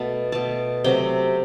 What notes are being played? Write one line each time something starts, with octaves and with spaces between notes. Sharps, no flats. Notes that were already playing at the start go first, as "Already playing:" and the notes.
Already playing: B2 A3 A5
B2 A3 A5
C3 F#3 A3 G5